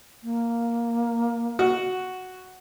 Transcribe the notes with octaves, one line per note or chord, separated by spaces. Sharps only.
A#3
F#4